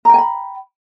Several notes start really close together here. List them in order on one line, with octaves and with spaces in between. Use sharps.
A#5 G5 G#5 B5